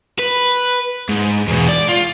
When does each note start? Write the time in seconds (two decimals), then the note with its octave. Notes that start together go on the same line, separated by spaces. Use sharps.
0.19 B4
1.09 G#2
1.47 E2 B2
1.68 D5
1.89 F4